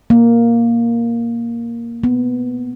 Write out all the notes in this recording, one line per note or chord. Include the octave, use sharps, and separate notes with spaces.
A#3
B3